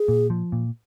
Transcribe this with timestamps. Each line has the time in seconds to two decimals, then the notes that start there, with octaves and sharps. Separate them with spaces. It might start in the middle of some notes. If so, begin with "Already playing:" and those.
Already playing: G#4
0.08 A#2
0.30 F3
0.52 A#2